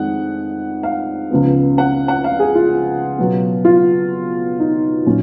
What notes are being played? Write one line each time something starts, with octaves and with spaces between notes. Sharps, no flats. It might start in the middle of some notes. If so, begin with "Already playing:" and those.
Already playing: F2 D#3 G#3 F#5
F5
C#2 C#3 F3 B3
F#5
F#5
F5
G#4
F4
B2 F#3 B3
F4
D#4
A#2 F#3 C#4